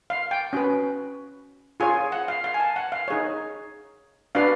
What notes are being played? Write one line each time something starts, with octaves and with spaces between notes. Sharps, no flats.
F5
G5
C#4 F#4 B4
F4 G#4 C#5 G#5
F#5
F5
F5
G#5
A5
F#5
F5
D#4 G#4 C#5
D4 F#4 B4 F5